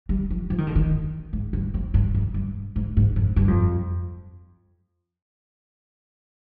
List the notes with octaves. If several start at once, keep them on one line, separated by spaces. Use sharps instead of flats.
G3
F3
F3
D#3
D3
D#3
G#2
G2
F2
G2
F2
G2
G#2
G#2
F2
G2
F2